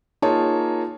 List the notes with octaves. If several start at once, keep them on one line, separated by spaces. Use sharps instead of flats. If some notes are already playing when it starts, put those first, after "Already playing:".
A#3 D#4 F4 G#4 C#5 A5